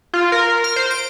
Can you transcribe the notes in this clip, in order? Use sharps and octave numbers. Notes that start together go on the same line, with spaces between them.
F4
A#4
F6
C5
D7